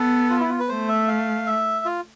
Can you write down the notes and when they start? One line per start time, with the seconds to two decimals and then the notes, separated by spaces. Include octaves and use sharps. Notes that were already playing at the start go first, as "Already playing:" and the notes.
Already playing: B3 A4
0.31 F4
0.40 E4
0.50 F4
0.60 B4
0.69 A3 C5
0.89 E5
1.08 F5
1.46 E5
1.85 F4